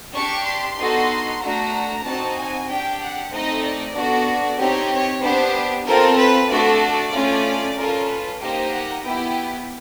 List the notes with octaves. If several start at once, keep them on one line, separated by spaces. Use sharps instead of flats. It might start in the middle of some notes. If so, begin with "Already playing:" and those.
D4 G4 C#6
C6
B3 D#4 F#4 A4
A3 D4 F#4 A#5
C4 D#4 F#4 A5
G#5
D4 G4 G5
F#5
A3 C4 D#4 D#5
D5
B3 D4 F#4 A4
C4 D#4 G4 C#5
C#5
B3 D4 G4 C5
C4 F4 A4 A#4
B4
A3 D4 F#4 A4 D5
A3 C#4 F4
C#4 F4 A4 A#4
B4
A#3 D#4 G4 C5
F#5
B3 E4 G4 G5